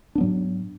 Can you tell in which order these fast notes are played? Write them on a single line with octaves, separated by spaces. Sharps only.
D4 B3 F#3 G#2